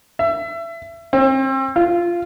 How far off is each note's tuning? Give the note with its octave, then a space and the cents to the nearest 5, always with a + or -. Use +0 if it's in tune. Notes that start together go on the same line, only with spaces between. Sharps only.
E5 +25
C4 +35
F4 -10